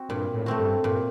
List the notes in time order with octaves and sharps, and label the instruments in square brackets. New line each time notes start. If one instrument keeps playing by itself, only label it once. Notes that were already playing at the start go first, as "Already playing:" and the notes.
Already playing: [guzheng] C4 F#4
[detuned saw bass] G2 [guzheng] A#2
[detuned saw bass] A2
[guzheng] A3 C4 F#4
[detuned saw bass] G2
[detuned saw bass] G2 [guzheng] A#2